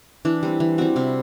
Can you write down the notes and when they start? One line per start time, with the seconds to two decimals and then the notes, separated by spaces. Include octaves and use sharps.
0.25 E3 D4
0.43 G3 C4
0.60 E3
0.78 G3 C4 F#4
0.96 C3 E4